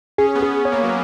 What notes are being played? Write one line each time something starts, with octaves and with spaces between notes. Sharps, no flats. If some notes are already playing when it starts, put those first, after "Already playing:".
C#4 G#4
B3
G#4
B3
C#5
A#3
F#3